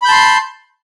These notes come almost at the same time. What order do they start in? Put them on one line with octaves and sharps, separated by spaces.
B5 G6 A5 C6